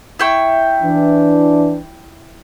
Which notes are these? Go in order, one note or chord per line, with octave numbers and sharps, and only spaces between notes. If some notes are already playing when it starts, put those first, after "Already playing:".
E4 G5 C#6
E3 D4